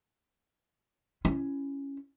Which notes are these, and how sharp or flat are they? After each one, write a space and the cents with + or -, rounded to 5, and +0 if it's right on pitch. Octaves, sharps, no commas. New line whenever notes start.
C#4 +0 E4 +20